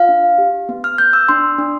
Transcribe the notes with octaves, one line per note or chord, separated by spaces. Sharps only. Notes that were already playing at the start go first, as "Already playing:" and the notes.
Already playing: F4 F5
D4
G4
B3
F6
B3 G6
E6
D4 C6
D4